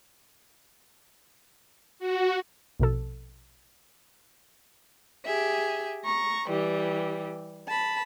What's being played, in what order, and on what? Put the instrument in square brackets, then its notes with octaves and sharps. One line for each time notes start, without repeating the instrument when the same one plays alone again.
[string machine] F#4
[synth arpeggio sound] A#1 B2 A4
[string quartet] G4 G#4 E5
A#5 C#6
E3 G3 G4
A5 B5